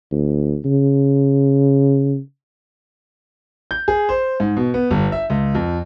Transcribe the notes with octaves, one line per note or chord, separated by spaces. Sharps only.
D2
C#3
G6
G#4
C5
G#2
B2
B3
G1
E5
C#2
F2